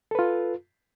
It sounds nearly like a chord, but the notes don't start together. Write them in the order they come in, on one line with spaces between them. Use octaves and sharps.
A4 B4 F4